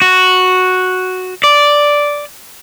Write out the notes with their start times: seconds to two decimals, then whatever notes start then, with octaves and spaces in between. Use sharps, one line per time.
0.02 F#4
1.44 D5